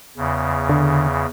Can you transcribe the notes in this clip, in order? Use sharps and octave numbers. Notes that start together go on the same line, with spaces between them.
E2 C#3
D3